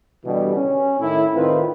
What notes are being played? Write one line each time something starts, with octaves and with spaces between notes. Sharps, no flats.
B2 D3 E3 G3
C#4
A2 D#3 E4
A2 D#3 C4 F4 B4